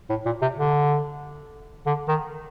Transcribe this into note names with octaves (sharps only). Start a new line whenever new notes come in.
A2
A#2
C3
D3
D3
D#3